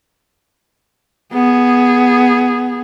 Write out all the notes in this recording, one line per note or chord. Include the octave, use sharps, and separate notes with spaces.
B3 G#4